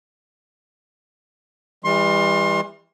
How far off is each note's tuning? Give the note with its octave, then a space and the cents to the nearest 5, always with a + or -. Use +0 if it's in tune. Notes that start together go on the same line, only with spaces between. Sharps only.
E3 +0 G3 +40 C6 +30